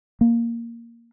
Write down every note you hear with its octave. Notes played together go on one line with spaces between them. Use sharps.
A#3